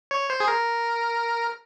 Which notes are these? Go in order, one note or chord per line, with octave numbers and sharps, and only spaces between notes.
C#5
C5
G#4
A#4